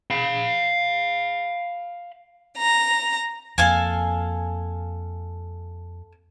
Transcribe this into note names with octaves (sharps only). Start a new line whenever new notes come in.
F5 B5
A#5
F2 A#3 A4 F5 G#5